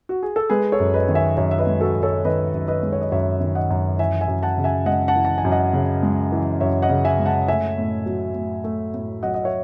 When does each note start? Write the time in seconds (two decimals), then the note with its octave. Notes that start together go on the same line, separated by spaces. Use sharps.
0.09 F#4
0.23 G#4
0.36 A4
0.50 G#3 G#4 B4
0.72 A4 C#5
0.80 F#2
0.94 B4 D#5
1.08 D#3
1.15 E5 G#5
1.37 F#2 C#5 E5
1.51 E5
1.59 B4 D#5
1.67 G#3
1.80 F#4 A4
1.96 F#2
2.03 A4 C#5
2.25 D#3 B4 D#5
2.54 F#2
2.68 B4 D#5
2.83 G#3
2.92 C#5
3.02 D#5
3.12 F#2 C#5 E5
3.40 D#3
3.55 D#5 F#5
3.70 F#2
3.99 E3 E5 G#5
4.21 E5 G#5
4.28 F#2
4.43 F#5 A5
4.58 C#3
4.64 E5 G#5
4.86 G#3 D#5 F#5
5.08 F#5 A5
5.16 E3
5.25 A5
5.38 G#5
5.45 F#2
5.52 D#5 F#5
5.73 C#3
6.03 G#3
6.32 E3
6.61 F#2 C#5 E5
6.82 D#5 F#5
6.89 C#3
7.05 E5 G#5
7.19 G#3
7.26 F#5 A5
7.48 A3 E5 G#5
7.78 A2
8.06 F#3
8.35 A2
8.64 A3
8.94 A2
9.23 F#3 D#5 F#5
9.34 D#5
9.44 C#5 E5